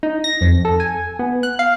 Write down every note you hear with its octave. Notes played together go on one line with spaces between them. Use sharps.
D#4
A#6
F2
A4
G#5
B3
F#6
F5